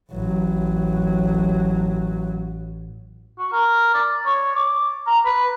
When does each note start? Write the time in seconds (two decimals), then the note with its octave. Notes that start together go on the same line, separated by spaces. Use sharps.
0.13 A1 F#3
3.38 F#4
3.52 A#4
3.94 D5
4.25 C#5
4.56 D6
5.07 A#5
5.25 B4